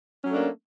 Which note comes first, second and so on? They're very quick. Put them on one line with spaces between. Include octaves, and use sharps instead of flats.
C#4 F#3 A3 D4 A#3